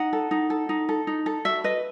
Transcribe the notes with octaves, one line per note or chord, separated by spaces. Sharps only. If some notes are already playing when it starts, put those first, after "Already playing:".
Already playing: D#4 F#5
A4
D#4
A4
D#4
A4
D#4
A4
F#4 E5
B4 D#5